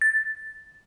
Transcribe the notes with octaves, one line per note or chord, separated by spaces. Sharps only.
A6